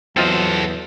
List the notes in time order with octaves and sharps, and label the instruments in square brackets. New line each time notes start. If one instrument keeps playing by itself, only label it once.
[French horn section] E2 F#3 [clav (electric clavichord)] C4 F4 D#5 [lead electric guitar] A4 C5